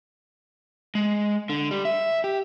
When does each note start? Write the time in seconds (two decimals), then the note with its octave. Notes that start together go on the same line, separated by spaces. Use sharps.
0.95 G#3
1.49 D3
1.71 G3
1.85 E5
2.24 G4